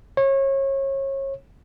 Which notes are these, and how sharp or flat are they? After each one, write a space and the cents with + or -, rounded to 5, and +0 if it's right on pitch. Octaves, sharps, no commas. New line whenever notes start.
C#5 -30